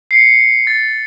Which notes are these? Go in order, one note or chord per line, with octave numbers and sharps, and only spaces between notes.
C7 C#7
A6